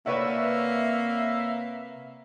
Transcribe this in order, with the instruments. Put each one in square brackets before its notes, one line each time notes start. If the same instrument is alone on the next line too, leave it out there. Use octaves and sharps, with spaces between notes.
[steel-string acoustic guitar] C3 D5 A5 [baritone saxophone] A#3 [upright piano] B4 C#5 F#5 [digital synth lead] E5